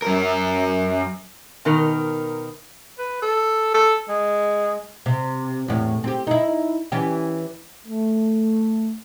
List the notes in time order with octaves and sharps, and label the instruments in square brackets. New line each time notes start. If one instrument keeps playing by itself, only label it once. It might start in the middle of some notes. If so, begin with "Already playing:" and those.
[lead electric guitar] F#2 A#4
[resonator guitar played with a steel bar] B2 D#3 A#4
[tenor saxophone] B4
A4
A4
G#3
[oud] C3
E2 A2
C4 G4
D#4 E4
E3 C#4 G4
[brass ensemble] A3